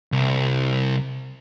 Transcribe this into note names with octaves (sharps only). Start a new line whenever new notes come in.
C2